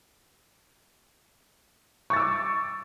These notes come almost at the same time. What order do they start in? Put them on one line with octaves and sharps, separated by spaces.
C#6 A6 E6 D6